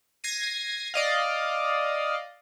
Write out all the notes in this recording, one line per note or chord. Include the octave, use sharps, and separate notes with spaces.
G#6 A#6 C7 D#7
D5 D#5 F5